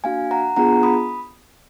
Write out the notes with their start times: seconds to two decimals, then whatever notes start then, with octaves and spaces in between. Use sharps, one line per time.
0.04 A#3 D4 F#4 F5 G#5
0.31 F#5 A#5
0.56 B3 D4 F4 G#4 F#5 A#5
0.83 B5 D#6